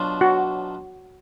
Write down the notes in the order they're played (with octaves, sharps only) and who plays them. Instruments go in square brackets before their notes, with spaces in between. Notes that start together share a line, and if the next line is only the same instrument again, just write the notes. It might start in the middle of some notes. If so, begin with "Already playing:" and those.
Already playing: [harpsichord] B2 F#3 D4 F4
[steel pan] F#4